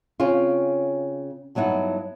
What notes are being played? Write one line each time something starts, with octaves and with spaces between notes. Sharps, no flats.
C#3 C4 C#4 F4
G2 F#3 B3 D#4 E4